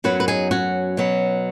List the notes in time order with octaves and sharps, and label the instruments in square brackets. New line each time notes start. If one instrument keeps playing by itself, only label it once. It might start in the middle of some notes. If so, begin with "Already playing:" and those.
[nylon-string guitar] F#2 F#3 B3 F#4 B4
B4
D#4 G#4
C#4 F#4
B2 F#3 B3